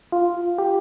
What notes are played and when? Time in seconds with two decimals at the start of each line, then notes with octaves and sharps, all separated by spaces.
0.12 F4
0.58 G4